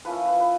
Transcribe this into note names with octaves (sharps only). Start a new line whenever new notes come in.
F3 A#3 C#4 E4 B4
B4
B4